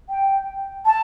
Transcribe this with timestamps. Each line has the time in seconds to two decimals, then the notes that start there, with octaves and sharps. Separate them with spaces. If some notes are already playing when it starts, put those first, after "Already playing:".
0.09 G5
0.86 A5